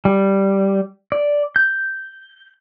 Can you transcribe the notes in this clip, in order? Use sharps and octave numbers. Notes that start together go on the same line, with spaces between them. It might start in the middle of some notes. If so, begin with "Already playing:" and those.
G3
D5
G6